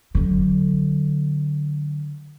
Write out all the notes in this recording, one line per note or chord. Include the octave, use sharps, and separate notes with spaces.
D3 F#3